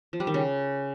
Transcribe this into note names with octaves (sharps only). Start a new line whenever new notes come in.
F3
G3
D#3
C#3